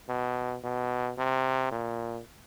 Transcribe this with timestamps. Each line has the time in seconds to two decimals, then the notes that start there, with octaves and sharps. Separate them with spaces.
0.09 B2
0.64 B2
1.18 C3
1.72 A#2